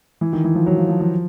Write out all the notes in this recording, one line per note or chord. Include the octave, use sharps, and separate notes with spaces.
E3
D#3
E3
F3
F#3
F3
F3
F3